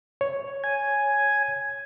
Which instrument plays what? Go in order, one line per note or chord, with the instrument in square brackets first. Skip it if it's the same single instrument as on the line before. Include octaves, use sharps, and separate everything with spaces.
[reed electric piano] C#5
[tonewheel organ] G#5